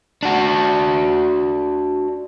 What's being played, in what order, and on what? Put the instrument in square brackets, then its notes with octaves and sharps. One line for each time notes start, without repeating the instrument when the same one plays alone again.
[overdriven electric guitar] D4 F#4